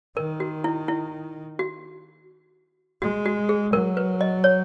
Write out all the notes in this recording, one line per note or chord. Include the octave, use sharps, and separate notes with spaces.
D#3 A#4
F#4
E4
E4
F#4
G#3 F#4
F#4
G#4
F#3 A#4
B4
D#5
C#5